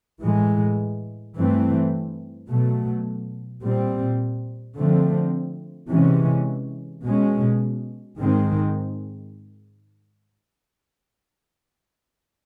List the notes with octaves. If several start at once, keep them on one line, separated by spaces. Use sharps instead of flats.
A2 E3 G#3
G2 E3 A3 C4
B2 F#3 A3
A#2 G3 C4
D3 F3 A3 C4
C3 E3 G#3 C#4
B2 G#3 C#4
G#2 D#3 G#3 C4